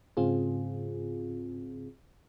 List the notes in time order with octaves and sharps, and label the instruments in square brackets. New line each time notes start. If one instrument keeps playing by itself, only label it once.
[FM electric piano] G#2 C#3 C4 F4 G#4